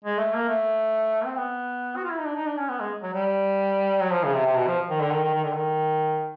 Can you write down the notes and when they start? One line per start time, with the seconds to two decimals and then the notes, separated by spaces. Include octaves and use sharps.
0.04 G#3
0.19 A3
0.34 A#3
0.49 A3
1.25 C4
1.37 B3
1.96 F#4
2.04 F4
2.11 E4
2.18 D#4
2.25 D4
2.36 D#4
2.47 D4
2.58 C#4
2.69 B3
2.80 G#3
3.02 F#3
3.14 G3
4.02 F#3
4.13 F3
4.24 C#3
4.35 C3
4.46 C3
4.57 B2
4.68 F3
4.90 D#3
5.01 D3
5.11 D#3
5.23 D#3
5.34 D#3
5.44 D3
5.53 D#3